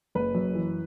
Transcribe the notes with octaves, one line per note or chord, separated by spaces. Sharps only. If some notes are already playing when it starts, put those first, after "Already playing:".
F#1 B4
F#2
E3